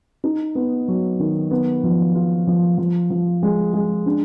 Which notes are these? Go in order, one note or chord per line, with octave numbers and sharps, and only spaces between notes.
D#4
B3
F#3
D#3
B3
F3
F4
F3
F3
F3
G#3
G#3
D4